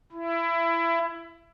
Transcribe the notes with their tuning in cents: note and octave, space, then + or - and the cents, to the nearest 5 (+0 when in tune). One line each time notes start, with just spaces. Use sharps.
E4 +20